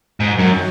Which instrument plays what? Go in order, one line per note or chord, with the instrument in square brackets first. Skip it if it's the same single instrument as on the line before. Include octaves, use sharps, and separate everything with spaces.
[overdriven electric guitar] G#2 [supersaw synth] D#3 F#3 D#4 F#4
[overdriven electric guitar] F#2